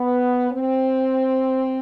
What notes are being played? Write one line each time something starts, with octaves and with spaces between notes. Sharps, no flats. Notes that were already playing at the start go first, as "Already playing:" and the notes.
Already playing: B3
C4